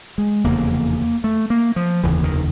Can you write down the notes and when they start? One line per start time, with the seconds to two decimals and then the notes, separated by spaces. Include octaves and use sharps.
0.18 G#3
0.44 F1 E2 C#3 A#3
1.24 A3
1.50 A#3
1.76 F3
2.03 F1 D#2 C#3 E3
2.23 D#3